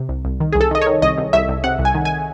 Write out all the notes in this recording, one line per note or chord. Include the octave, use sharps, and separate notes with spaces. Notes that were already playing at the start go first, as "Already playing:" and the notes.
Already playing: C3
C2
C2
D#3
C2 G#4
A4
D#3 D#5
D#3 C#5
C2 D#5
C2
C2 E5
C2
C3 F#5
C2
G#5
D#3
G#5